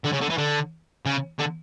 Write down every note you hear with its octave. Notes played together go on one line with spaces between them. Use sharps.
D3
C#3
D3
E3
D3
C#3
D3